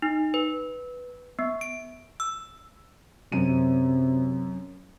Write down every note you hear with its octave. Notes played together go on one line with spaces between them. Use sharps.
D#4
B4
B3
D7
E6
F#2 C3 D#7